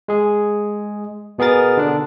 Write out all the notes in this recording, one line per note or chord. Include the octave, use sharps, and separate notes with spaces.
G#3 G#4
B2 B3 G#4 A#4 A6
D3 D4